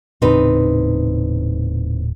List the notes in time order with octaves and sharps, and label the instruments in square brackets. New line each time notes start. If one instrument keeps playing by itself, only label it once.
[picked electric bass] D#1 A2 C#3 [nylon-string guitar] C4 D#4 B4